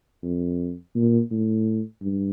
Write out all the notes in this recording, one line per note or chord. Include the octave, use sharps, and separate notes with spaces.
F2
A#2
A2
G2